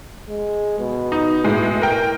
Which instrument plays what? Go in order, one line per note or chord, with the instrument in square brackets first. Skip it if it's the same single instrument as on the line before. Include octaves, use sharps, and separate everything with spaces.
[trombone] G#3
B2
[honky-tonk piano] D#4
A2 G#3
A#4 G5